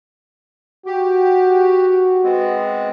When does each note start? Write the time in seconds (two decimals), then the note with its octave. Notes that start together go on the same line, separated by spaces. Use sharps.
0.86 F#4 G4
2.24 G#3 B3 C4